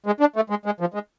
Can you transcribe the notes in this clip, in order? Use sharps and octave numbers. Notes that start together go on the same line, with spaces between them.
G#3
D4
A3
G#3
G#3
F3
G#3